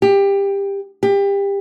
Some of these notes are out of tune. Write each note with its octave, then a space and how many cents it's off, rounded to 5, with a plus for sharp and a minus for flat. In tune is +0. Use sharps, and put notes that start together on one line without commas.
G4 +20
G4 +25